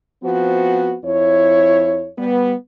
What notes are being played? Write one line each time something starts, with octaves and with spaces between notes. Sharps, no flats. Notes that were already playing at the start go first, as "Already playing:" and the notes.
F3 B3 C4 F#4
F2 E4 C#5
G3 B3